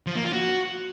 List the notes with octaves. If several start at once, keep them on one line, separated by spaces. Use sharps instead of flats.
F3
A#3
F4
F#4